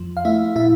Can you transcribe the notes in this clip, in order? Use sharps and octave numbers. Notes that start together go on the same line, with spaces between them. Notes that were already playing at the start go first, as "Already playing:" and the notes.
Already playing: F2 F3
F5
A3 E4 E5
A#2 E4 E5